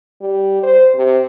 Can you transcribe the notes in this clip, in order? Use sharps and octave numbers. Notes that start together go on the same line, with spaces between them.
G3
C5
C3